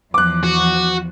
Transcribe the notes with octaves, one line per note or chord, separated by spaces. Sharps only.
E2 F3 D6 F#6
F#4